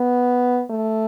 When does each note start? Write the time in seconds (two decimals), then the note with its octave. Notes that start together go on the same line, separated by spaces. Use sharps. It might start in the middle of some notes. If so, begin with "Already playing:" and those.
Already playing: B3
0.70 A3